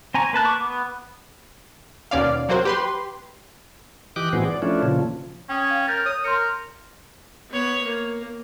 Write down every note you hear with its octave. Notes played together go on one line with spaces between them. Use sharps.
C4 G#5 A#5 C#6
A#3 B4 A5 F#6
C#6 D6
B3
D#2 B2 C#4 D5 F5
F#3 A#3 C4 F#4 C5
G4 B4 C6
E3 G4 D#5 G5 D6 F#6
A2 E3 B3 C4 F#4 G#4
D5
F3 A3 C#4 D4 E4
A#2 C#3 F3
C#4 G5 D#6
F5 G5
A#4 G6 A6
C#5 D#6
A#4 C6 G6 C#7
B3 C#5
A#3